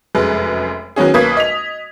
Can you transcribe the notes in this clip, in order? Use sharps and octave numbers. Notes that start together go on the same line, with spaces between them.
F1 F#2 G#3 B4
D#3 F#3 B3 C#4 G#4
B1 A#3 B4 D#6 G#6 B6
D#5 B6 F7